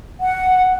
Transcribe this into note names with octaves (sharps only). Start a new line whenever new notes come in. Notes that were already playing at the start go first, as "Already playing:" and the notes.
F#5